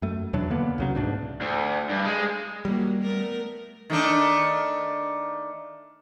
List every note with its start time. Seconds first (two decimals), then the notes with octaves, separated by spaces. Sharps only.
0.02 F#2 A3
0.33 E2 B2 F#3 D4
0.50 D3 A#3 B3
0.78 C2 C#3 F#3
0.95 D2 G#2 B2 D4
1.41 D2
1.90 G2
2.05 G#3
2.65 D#3 F#3 G3 A#3
3.02 A3 B3 A#4
3.90 D#3 A3 D4